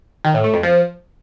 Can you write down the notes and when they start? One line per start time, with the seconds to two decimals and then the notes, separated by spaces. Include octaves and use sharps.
0.25 D#3
0.34 A2
0.44 A3
0.54 F2
0.63 F3